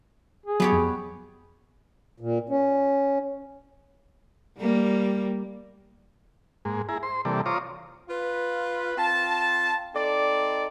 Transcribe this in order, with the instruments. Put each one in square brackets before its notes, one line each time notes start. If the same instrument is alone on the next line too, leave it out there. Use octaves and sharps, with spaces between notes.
[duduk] G#4
[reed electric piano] F#3 [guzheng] B3 G4 C#5
[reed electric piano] F2
[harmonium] A#2
C#4
[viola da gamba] G3 A#3
[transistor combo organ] G#2 G#3 A#3
E4 G#4 A#5
C5 C6
C3 E3 G3 A#3 A4 D5
F4 C5 C#5 A#5 D6 D#6
[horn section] F4 B4
C4 F4 A5
C4 D#4 A4 D5